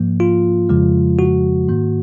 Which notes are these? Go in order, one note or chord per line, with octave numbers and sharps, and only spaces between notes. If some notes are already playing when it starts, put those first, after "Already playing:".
Already playing: G#2 F3 A#3
F4
F2 C#3 F3 G#3
F#4
G#2 D#3 A#3